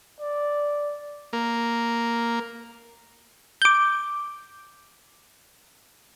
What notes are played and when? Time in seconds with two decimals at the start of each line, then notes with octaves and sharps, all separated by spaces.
0.20 D5
1.33 A#3
3.62 D6 G6